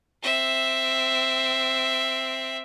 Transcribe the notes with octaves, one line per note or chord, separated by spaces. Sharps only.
C4 E5